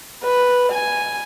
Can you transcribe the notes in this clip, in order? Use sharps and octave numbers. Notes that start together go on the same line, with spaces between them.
B4
G#5